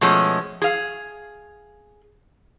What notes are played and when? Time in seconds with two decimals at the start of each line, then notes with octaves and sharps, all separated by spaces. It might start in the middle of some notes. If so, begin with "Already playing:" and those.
0.01 B2 F3 G#3 A3 C#4
0.62 G#4 F5